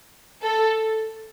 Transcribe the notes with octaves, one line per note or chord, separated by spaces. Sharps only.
A4